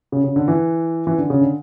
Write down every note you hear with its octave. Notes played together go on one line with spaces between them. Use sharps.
C#3
C#3
D3
E3
E3
D3
C#3
D3